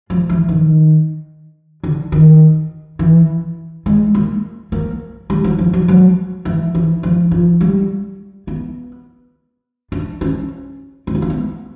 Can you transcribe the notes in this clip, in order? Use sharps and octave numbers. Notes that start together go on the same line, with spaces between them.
F3
E3
D#3
D3
D#3
E3
G#3
A#3
A#3
G3
F#3
F3
F#3
F#3
E3
E3
F3
F3
G3
B3
D4
C#4
C4
B3
A#3
B3